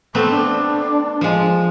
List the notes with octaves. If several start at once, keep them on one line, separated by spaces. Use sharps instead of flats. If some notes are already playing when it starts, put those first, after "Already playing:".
A3 B3 C4 A4
D4
F3 G#3